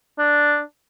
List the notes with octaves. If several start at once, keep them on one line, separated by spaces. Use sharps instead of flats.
D4